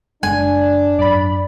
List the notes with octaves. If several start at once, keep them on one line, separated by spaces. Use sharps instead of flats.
F#1 G#3 D4 G#5
G#1 F#2 D5 B5